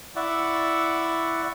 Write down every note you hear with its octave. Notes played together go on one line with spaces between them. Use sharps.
E4 D5 E5 F#5 C#6